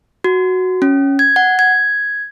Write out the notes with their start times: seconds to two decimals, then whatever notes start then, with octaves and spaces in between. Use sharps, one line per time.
0.24 F#4
0.82 C#4
1.19 G#6
1.36 F#5
1.59 G#6